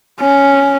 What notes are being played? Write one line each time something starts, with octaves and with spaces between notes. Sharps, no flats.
C#4